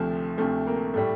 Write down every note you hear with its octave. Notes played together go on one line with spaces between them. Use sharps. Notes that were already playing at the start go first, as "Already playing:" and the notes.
Already playing: D2 C3 F3 A3
D2 C3 F3 A3
A#3
A2 G3 A3